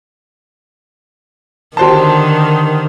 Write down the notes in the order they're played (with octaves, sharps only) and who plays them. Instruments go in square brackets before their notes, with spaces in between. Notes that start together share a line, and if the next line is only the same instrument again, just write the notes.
[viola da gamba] D3 D#3 [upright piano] G4 C5 A5